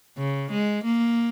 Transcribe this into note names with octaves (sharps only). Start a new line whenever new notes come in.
C#3
G#3
A#3